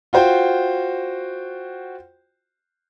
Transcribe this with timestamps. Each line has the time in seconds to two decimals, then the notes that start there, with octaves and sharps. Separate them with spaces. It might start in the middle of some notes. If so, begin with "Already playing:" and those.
0.13 F4 F#4 C5 G5